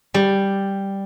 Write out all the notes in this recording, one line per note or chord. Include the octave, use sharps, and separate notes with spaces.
G3